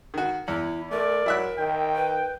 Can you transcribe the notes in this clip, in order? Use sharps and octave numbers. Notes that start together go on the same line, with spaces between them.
D#3 F#4
E2 E4
A3 A#4 D5
F#3 E4 E5 F#6
D#3 G5
B4